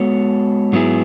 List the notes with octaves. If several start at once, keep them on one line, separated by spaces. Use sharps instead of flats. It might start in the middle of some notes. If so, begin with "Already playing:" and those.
Already playing: G#3 B3 F#4 A4 C#5
G#2 F#3 B3 E4 G#4